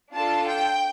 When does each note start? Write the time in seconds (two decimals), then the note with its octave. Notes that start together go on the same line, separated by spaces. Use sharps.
0.13 D4 F4 A4 A5
0.48 G5